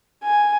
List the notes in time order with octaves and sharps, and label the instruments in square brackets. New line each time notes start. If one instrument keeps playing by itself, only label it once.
[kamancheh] G#5